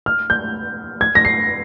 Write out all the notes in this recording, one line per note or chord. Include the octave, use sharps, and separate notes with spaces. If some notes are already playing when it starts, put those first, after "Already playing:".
F6
G6
G#6
A#6
C7